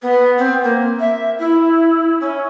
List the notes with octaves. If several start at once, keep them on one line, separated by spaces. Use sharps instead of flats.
B3
C4
A#3
E5
E4
C#4